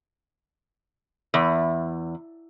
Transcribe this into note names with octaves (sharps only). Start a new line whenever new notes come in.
E2